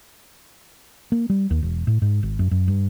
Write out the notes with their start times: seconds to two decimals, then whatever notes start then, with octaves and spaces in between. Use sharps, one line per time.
1.12 A#3
1.30 G3
1.50 D#2
1.62 E1
1.87 A2
2.02 G#2
2.23 G#1
2.39 F#2
2.51 F#2
2.68 G2